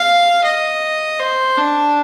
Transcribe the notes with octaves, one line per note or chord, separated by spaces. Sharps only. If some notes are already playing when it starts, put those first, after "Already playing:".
Already playing: F5
D#5
C5
D4